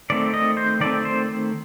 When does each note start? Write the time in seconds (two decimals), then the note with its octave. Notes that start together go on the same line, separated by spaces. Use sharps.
0.10 D#3 A3 C4 D5
0.34 D#5
0.57 C5
0.80 D#3 A3 C4 D5
1.05 C5